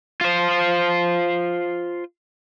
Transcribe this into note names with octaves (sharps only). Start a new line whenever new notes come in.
F4 C5